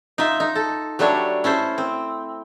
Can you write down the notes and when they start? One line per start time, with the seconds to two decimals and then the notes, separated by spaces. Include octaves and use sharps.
0.18 D#4 F4 E5
0.40 D#4
0.55 A4
0.99 F#3 G3 A3 D4 C#5
1.44 C#4 E4 A4 C5
1.78 C4